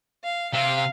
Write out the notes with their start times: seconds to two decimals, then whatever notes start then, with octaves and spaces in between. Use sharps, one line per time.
0.24 F5
0.53 C3 F5